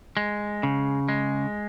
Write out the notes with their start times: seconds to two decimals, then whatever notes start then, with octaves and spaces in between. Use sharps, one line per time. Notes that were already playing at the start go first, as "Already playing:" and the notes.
0.17 G#3
0.63 C#3
1.09 G#3